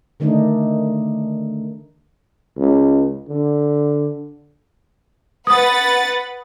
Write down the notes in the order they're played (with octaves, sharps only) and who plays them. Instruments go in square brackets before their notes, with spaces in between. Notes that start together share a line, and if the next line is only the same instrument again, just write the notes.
[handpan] D3 D#3 A3 D4 D#4
[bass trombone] C#2
D3
[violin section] B4 F#5 A6 [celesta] D#6